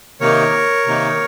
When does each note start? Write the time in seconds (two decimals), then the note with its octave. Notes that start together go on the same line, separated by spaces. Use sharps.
0.20 C3 D#3 A#3 D#4 A#4 C#5
0.87 C3 D#3 A#3 D#4